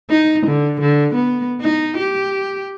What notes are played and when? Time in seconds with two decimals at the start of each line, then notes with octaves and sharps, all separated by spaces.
0.10 D#4
0.46 D3
0.81 D3
1.15 B3
1.61 D#4
1.97 G4